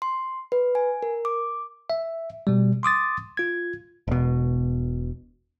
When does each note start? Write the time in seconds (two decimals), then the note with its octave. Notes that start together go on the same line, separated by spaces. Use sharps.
0.02 C6
0.52 B4
0.75 G#5
1.03 A#4
1.25 D6
1.90 E5
2.47 B2 G3
2.83 C6 D6 D#6 A6
3.37 F4 G#6
4.08 E1 B2